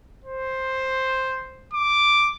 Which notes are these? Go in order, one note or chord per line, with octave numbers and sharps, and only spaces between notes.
C5
D6